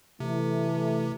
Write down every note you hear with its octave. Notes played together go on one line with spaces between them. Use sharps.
C3 E3 A3